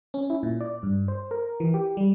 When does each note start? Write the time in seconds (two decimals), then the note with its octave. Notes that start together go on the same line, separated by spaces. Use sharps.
0.14 C#4
0.30 E4
0.43 A#2
0.61 D5
0.83 G2
1.08 C5
1.31 A#4
1.60 E3
1.74 G4
1.97 G3